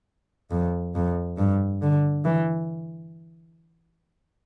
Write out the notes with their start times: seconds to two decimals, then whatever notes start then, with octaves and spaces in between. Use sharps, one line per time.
0.51 F2
0.95 F2
1.38 G2
1.82 D3
2.25 E3